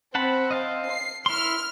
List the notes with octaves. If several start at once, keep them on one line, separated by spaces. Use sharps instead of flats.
C4 F#5 A5 B5
D#5 F5 A5
C7
E4 C6 F6